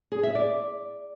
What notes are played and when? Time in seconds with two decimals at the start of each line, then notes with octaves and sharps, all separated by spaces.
0.12 G#4
0.23 E5
0.35 D5